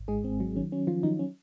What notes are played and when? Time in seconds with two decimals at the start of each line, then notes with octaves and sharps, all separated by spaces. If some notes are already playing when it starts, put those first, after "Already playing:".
Already playing: G#1
0.08 G#2 G#3 G#4
0.23 G#1 C4
0.40 F#3
0.56 D#3 C#4
0.72 F#3 C#4
0.87 D#3 F3 F4
1.03 D#3 F#3 D#4
1.19 C#4